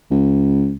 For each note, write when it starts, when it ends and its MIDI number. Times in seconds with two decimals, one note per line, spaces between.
0.11 0.75 37